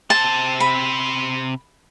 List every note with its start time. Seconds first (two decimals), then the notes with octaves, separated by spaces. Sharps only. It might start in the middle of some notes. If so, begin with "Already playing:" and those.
0.10 C3 C5 A5
0.60 B5